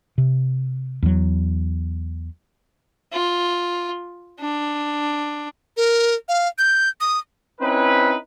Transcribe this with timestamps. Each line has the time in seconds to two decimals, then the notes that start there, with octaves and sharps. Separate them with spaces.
0.18 C3
1.03 E2 F#3
3.12 F4
4.40 D4
5.77 A#4
6.29 F5
6.58 G6
7.01 D#6
7.61 C4 C#4 D#4 E4 B4